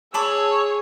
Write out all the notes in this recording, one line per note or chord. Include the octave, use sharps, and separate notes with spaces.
G#4 C#5 A5 B5 D6 E6